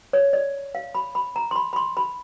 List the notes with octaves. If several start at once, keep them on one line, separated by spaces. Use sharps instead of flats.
C#5
D5
F5
B5
B5
A#5
C6
B5
B5
C6
B5